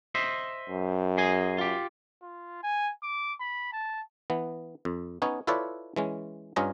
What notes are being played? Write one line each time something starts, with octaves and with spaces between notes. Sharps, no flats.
C5 D#5 E5
F#2
G#4 D#5 G#5
F4 G4
F4
G#5
D6
B5
A5
E3 B3
F2
B3 C#4 D#4 C#5
E4 F4 A4 B4 C#5 D5
E3 G#3 C#4
G2 C#4 F4 D#5 G#5 A#5